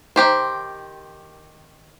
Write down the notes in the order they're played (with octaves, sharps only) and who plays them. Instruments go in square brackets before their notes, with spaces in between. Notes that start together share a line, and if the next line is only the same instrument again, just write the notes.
[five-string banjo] D#3 C4 G4 C5